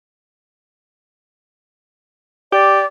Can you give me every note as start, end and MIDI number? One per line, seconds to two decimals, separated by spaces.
2.52 2.82 67
2.52 2.85 74